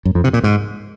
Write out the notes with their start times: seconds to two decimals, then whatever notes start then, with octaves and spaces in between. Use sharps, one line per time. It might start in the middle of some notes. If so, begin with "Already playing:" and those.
0.05 F#2
0.15 F2
0.24 C3
0.33 A#2
0.44 G#2